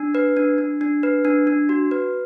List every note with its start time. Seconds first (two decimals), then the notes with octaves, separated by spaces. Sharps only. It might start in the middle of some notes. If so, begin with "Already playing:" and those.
Already playing: D4
0.15 B4
0.37 D4
0.58 D4
0.81 D4
1.03 B4
1.25 D4
1.47 D4
1.69 F#4
1.91 B4